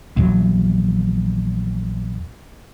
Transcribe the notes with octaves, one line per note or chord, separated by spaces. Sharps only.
A#1 E2 F#3